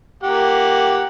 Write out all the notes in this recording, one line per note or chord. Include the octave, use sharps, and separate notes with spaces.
A#3 G4 F#5